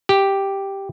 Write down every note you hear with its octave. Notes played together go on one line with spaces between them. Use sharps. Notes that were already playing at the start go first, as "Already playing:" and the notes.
G4